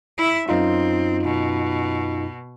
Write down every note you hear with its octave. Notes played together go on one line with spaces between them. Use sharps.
E4 E5
F#2 C4 D#4 F4
B2